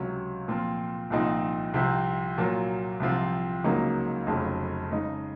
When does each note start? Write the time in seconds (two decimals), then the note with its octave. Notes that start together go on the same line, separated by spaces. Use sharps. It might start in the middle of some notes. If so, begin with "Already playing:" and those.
Already playing: C#2 C3 F#3 C#4
0.48 A#2 F3 C4 F4
1.10 C2 A#2 F3 C4 D#4
1.74 C2 C3 F3 C4
2.37 A#2 F#3 A#3 F4
3.00 C2 C3 F3 C4 F4
3.64 C#2 C#3 F#3 A#3 D#4
4.27 F1 F2 C#3 F#3
4.90 C#3 G#3 D#4